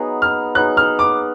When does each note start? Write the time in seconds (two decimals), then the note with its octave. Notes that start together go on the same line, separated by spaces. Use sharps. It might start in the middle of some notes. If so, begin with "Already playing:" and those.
Already playing: F#3 B3 D#4 G#4
0.22 F6
0.55 F#3 B3 D#4 G#4 F#6
0.77 F6
0.99 D6